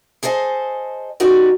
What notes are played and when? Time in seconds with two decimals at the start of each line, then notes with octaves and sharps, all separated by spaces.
0.23 G#4 A4 C5 D#5 G#5
1.20 C#4 D#4 F#4 G4 A#4 D5